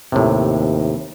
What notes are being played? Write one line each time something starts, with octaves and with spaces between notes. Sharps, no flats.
D#2 A2 C3